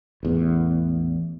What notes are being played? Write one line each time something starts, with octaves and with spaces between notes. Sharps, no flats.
A1 E2